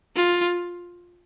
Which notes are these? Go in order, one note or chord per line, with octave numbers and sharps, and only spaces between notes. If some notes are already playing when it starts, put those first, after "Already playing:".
F4